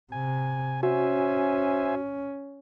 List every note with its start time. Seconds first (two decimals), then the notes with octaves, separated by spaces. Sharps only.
0.12 C3 G#5
0.83 C#4 F#4 C5 E5 G#5